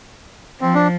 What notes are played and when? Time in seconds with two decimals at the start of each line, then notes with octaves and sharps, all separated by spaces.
0.61 F3 C4
0.74 D4